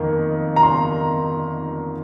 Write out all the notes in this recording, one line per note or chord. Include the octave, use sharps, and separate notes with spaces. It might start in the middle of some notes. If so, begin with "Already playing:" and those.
Already playing: F2 D#3 A#3
A#5
C6